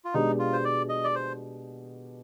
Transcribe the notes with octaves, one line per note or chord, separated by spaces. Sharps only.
F4
B2 G#3 D4 D#4 G4
F4
C5
D5
D#5
D5
C5